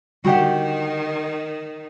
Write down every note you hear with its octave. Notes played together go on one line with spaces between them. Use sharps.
D3 D#3 G3 F#4 G4 F#5